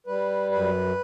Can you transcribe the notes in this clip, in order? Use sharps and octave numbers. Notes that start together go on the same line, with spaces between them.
G3 B4
F#2 B4